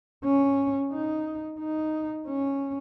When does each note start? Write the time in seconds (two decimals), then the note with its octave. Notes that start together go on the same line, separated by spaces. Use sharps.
0.24 C#4
0.92 D#4
1.59 D#4
2.28 C#4